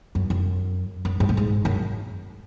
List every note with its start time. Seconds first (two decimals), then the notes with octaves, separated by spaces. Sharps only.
0.15 F#2
0.30 F#2
1.05 F#2
1.20 G#2
1.29 A2
1.37 G#2
1.65 F#2